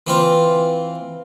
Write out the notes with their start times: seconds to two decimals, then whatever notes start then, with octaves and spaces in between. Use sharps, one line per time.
0.07 E3 C4 F4